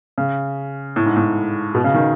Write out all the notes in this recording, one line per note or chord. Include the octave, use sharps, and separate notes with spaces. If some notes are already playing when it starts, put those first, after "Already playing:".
C#3
A2
G#2
A2
B2
C#3
D#3